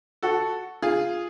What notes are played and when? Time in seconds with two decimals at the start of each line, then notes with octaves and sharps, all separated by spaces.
0.23 F#4 A4
0.82 F4 G#4